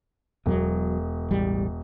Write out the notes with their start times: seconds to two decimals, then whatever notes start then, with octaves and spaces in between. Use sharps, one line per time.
0.46 E1 B2 F#3
1.31 A1 G3